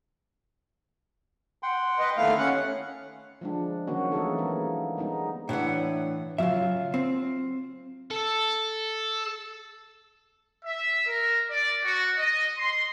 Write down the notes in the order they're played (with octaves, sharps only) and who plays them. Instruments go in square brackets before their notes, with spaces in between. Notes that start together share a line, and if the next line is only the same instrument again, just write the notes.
[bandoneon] F#5 G5 C6
[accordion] B4 D#5
[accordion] D#2 A3 F5 [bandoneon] B3 E4
[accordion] C#4 F#5
[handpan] F3 G#3 D4
D#3 F#3 A#3 C#4 F#4
E3 A3 A#3 D#4 G#4 A4
G#3 A#3 B3
G3 G#3 B3 D#4
[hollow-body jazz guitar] A2 E3 [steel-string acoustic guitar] D4 B4 F#5
[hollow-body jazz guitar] C#3 E5 [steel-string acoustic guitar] F#3 F4
[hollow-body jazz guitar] C4
[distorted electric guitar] A4
[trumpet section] E5
A#4
D5
F#4
D#5
C6